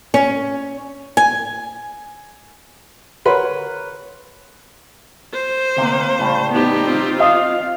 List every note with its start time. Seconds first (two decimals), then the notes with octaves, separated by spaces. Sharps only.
0.14 C#4
1.17 G#5
3.25 A#4 B4 C#5 F#5 B5 C6
5.34 C5
5.77 D2 C3 A#3
6.19 A2 C#3 G3
6.52 B3 D#4 G4
6.85 C4 F4
7.20 D#5 F5